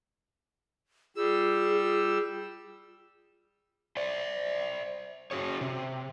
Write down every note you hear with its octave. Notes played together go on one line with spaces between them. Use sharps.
G3 F4 G#4 E6
C5 D5
C#4 F#4 G#4 C#5
C3